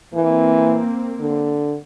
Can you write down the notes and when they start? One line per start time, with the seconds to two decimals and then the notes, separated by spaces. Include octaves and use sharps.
0.15 E3 A#3 C4
1.21 D3